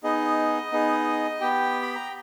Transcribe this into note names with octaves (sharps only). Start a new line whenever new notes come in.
B3 D#4 G#4 D#5
B3 D#4 G#4
B3 G4 G5
B5
A#5